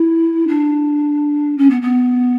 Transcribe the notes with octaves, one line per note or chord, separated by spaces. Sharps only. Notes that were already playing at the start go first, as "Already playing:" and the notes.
Already playing: E4
D4
C#4
B3
B3